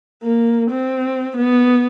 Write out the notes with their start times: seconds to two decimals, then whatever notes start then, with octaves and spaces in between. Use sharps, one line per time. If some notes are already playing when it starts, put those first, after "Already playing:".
0.24 A#3
0.71 C4
1.37 B3